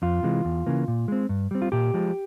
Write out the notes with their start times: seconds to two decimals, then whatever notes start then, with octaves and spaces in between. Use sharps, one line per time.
0.02 F2 F4
0.23 C3 E3 G#3
0.45 E2
0.66 C#3 E3 A#3
0.88 A#2
1.08 G#3 C4
1.29 G2
1.51 G3 C4
1.62 F4
1.72 A#2 G4
1.94 F3 G#3